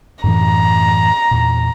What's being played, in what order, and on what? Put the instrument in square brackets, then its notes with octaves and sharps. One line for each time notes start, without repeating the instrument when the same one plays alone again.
[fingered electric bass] F#2 A2 E3 [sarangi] A#5
[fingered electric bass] E2 A#2